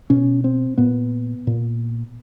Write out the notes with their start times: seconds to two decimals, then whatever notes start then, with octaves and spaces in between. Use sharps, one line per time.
0.10 B2 C#4
0.44 C4
0.78 A#2 B3
1.47 A#2